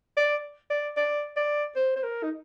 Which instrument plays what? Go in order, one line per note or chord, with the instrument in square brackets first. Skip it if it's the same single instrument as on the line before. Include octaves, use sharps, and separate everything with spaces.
[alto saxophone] D5
D5
D5
D5
C5
C5
A#4
D#4